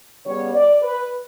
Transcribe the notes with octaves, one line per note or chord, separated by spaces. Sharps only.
C#3 G3 B3 C#5
D5
B4